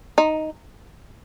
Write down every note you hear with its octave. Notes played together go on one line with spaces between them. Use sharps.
D#4